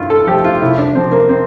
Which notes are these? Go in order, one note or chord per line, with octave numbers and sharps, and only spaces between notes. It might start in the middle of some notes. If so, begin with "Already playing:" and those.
Already playing: G2 E4 F4
A4
F3 A3 G4
F4
C2 E4
D4
C3 F3 C4
A#3
C4